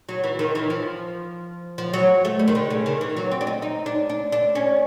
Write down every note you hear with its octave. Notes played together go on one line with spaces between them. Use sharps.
F#3
E3
D#3
E3
F3
F3
F#3
A3
G3
D#3
D3
C#3
D#3
E3
F#3
C4
D4
D#4
D#4
D4
D4
D4
C#4